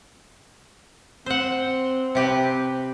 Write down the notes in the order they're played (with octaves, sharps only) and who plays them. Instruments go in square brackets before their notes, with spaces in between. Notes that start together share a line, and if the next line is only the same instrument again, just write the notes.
[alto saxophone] C4 [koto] C5 F#5
[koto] C3 G4 B4